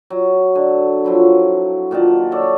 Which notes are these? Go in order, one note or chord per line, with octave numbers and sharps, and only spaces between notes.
F#3
D3
F3 F#3 E4
A#2 D#3 F#5 A5
A4 C#5 D5